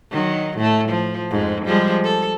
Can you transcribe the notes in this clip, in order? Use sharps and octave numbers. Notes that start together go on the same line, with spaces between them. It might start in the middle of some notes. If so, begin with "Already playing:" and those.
D#3 F#3
A2 A3
F3
F2 G#2
F3 G3 G#3
A4